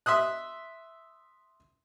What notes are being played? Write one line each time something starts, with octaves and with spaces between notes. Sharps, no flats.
E5 C6 D#6 F#6